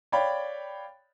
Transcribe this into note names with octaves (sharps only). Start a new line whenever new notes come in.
C#5 D5 F5 G5 B5